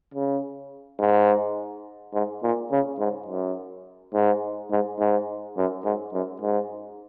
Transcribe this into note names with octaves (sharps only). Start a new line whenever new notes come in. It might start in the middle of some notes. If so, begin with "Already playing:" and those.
C#3
G#2
G#2
A#2
C#3
G#2
F#2
G#2
G#2
G#2
F#2
G#2
F#2
G#2